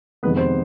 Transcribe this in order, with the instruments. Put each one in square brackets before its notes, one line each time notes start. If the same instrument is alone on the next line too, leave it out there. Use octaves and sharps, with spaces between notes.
[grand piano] F2 C3 D#3 G#3 B3 B4
C5